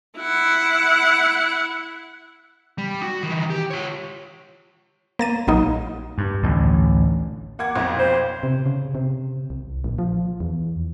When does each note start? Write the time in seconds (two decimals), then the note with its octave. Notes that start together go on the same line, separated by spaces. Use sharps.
0.18 E4 F#5
2.78 G3
3.03 F#4
3.23 D#3 E3
3.50 G4
3.71 F4 C#5
5.19 A#3 A6 D#7
5.47 A#1 F#3 A#3 D#4
6.18 G2
6.42 A1 D2
7.59 A#3 F#5 D6 G#6
7.75 B1 F2 C6
7.99 C5
8.43 C3
8.66 C#3
8.95 C3
9.50 C2
9.84 A#1
9.99 F3
10.40 E2